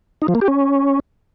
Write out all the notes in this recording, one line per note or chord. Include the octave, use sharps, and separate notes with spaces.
D#4
F3
A#3
G4
C#4